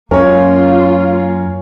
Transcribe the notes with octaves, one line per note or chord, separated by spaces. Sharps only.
F#2 A#3 C#4 F4 A#4 C#5